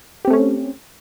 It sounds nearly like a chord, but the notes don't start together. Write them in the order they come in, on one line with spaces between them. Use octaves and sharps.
G4 C4 A3 C#4